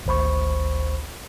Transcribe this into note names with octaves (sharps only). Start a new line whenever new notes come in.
G#1 D2 C5 B5 C#6